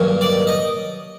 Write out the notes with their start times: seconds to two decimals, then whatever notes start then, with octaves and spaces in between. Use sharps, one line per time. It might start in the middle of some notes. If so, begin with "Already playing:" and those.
Already playing: G2 D#3 F#3 A#3
0.21 D5
0.47 D#5